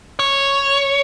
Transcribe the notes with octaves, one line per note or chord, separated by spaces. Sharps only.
C#5